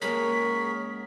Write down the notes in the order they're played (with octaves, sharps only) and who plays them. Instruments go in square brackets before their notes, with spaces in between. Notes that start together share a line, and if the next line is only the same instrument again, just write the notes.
[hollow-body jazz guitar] C#2 G#3 A#3 [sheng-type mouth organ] G#4 A#4 C#5 [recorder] B6